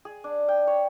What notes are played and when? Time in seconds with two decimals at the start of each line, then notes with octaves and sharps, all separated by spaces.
0.05 G#4
0.24 D4
0.48 G5
0.67 C#5